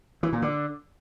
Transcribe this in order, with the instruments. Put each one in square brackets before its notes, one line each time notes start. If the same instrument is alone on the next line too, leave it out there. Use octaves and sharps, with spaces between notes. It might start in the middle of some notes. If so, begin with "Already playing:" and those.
[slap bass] E3
A#2
D3